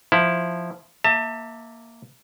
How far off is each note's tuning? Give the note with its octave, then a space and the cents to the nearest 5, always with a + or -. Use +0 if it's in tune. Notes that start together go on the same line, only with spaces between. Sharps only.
F3 +0 E4 +0
A#3 +0 E5 -20 A5 +30